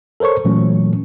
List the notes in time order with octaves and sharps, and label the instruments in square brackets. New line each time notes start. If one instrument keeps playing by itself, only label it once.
[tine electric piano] A4 A#4 C5 C#5 C#6
A#2 E3 F#3 A3 C#4